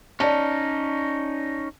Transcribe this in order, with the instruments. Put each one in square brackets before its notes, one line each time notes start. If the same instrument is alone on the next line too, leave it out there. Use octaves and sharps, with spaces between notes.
[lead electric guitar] C#4 D#4 [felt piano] D5 A5